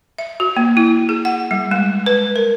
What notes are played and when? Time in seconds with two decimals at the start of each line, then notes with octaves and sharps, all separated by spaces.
0.18 E5
0.40 F#4
0.57 A#3
0.77 E4
1.09 G#4
1.25 F#5
1.51 G3
1.71 G#3
2.06 B4
2.36 A#4